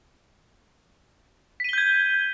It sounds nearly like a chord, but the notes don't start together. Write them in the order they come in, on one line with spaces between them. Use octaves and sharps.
B6 D#7 G7 G6 G#6